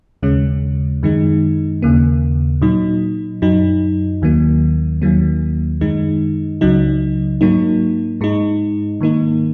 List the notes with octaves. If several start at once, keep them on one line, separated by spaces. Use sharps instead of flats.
D#2 C#3 G#3 C#4
F#2 D#3 G#3 D#4
D#2 C#3 A#3
A#2 F#3 D#4
F#2 F#3 D#4
D#2 D#3 F#3 A#3
D#2 D#3 F#3 A#3
F#2 D#3 G#3 D#4
C#2 C#3 F#3 D#4
G#2 F#3 A#3 D#4
G#2 G#3 D#4
G#2 D#3 A#3 D#4